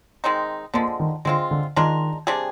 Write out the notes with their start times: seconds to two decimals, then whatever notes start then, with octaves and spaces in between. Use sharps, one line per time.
0.24 D#3 G#3 C4 D#4
0.74 D3 F3 G#3 A#3
1.00 D#3
1.25 D3 G#3 C4 F4
1.51 D3
1.76 D#3 G#3 D4 F4 A#4
2.27 C3 G3 D4 G#4